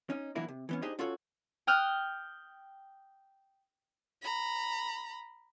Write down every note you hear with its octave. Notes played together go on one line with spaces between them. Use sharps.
C#4 D#4
B2 E3 F#3 A#3 D4 E4
C3
E3 B3 C#4
D4 D#4 G4 G#4 C5 D#5
C#4 F4 F#4 A4 C#5
G5 D#6 F6 F#6
A#5 B5